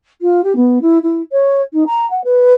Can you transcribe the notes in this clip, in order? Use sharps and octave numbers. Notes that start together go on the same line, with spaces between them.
F4
G4
B3
E4
E4
C#5
D#4
A#5
F#5
B4